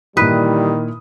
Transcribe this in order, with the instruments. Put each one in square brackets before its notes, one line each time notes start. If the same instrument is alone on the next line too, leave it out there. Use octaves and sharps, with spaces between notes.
[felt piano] A#2 E4 D#6 [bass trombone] D#3 [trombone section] E3 G3 [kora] B4